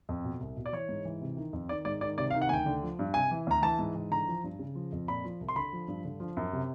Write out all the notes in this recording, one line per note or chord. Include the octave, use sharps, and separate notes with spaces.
F2
B2
C2
B2
D5
E3 C#5
G#2
E3
C3
D#3
F2
D#3 D5
G#2 D5
D#3 D5
C3 D5
F5
D#3
F#5
D2 G5 G#5
D3
F3
G2
C3 G#5
E3
D2 A#5
E3 A5
G#2
E3
D3 A#5
F3
G2
C#3
F3
F2
A#2 B5
F3
C2
C6
D3 B5
F3
G2
D3
F3
F#2
C3